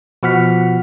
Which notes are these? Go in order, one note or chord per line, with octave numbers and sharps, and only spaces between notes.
B2 F3 F#5 F6 B6